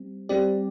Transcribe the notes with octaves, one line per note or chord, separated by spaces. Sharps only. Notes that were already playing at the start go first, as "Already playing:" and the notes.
Already playing: G3 C4
G3 C4 G4 D5